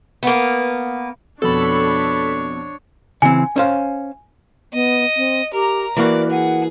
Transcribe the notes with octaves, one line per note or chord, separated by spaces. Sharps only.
A#3 B3
F2 B2 D4 A4 C#5 B5
C#3 E3 C4 G#5
C#4 C5 F5
B3 D#5
C4
G4 A#4 A#5
E3 A#3 F#4 A#4 D5
G#4 F#5